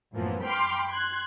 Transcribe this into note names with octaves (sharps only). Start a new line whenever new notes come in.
F#2 A2 E3 F3 A#3 B3
G5 B5 C6 D6 F6
C6 F#6 G#6